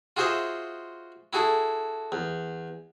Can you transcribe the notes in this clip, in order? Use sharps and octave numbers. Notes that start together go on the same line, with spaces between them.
F4 F#4 G#4 C5 D#5 E5
E4 F#4 G#4 A4
E2